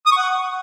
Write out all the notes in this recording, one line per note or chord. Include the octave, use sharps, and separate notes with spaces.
D#6
C#6
F#5